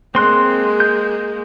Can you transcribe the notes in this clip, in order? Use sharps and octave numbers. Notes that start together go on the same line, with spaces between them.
G#3 A#3 C4 C6 F#6
G6